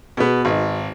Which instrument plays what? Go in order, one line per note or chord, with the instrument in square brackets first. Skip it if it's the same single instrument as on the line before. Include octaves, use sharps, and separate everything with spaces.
[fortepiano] B2 B3 [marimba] F#4 G#4
[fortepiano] G#1 [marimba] D#4 B4 D#5